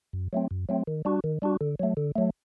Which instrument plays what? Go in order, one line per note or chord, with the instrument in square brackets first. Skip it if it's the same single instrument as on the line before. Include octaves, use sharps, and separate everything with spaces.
[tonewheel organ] F#2
F#3 A3 C4
F#2
F#3 A3 C4
D#3
G3 D4 F#4
D#3
G3 D4 F#4
D3
F#3 A3
D3
F#3 A3